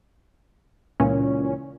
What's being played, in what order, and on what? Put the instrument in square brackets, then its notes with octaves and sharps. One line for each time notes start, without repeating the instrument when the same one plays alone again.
[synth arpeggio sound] C#2 A#2 E3 C#4